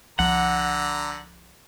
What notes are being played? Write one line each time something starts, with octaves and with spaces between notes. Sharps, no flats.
C2 D3 F3 F#5 A#5